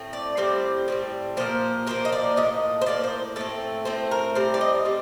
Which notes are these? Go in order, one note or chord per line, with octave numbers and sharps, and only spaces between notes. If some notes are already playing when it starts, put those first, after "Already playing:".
Already playing: A2 A3 C4
D5
A2 G3 C4 C5
A2 G3 C4
A#2 F3 A#3 C5
A#2 F3 A#3 C5
D#5
D5
A2 F3 A#3 D#5
C5
A2 F3 A#3 D5
C5
A2 A3 C4 A4
A2 A3 C4 C5
A#4
A2 G3 C4 C5
D5
D#5
A2 G3 C4